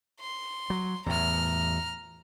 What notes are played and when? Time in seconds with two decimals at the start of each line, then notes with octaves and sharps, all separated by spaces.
0.20 C6
0.70 F#3
1.06 E2 A2 A#5 F6